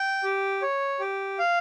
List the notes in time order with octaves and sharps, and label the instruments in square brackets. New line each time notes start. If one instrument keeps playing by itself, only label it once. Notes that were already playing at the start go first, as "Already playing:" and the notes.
Already playing: [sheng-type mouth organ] G5
G4
C#5
G4
F5